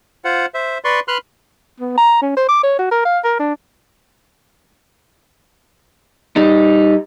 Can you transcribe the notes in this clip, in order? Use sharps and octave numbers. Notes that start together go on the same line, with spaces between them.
F4 C5 F#5
C5 E5
B4 D5 C6 C#6
B4 C6 F6 F#6
B3
A#5
C#4
C5
D6
C#5
F#4
A#4
F5
A#4
D4
G3 D#4